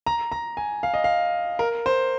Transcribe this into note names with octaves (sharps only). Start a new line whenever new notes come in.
A#5
A#5
G#5
F5
D#5
F5
A#4
C5